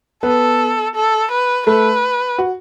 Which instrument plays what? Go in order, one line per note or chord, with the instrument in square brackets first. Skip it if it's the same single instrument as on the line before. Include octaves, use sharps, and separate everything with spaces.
[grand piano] B3 B4 [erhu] A4
[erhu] A4
B4
[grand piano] A3 A4 [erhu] B4
[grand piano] F#4